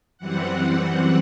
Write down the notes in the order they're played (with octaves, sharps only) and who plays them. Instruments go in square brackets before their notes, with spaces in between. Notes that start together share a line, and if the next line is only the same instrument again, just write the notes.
[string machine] F#2 E3 G3 C4 F#5